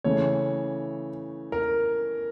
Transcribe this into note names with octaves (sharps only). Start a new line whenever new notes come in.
C#3 E3 A3 C#5
A#4